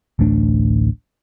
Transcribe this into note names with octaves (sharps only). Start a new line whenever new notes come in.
D1 A1 A3 D4